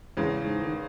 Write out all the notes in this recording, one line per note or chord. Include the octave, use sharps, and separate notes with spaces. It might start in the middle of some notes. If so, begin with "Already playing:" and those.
E2 C#3 G#3
G#2
D#3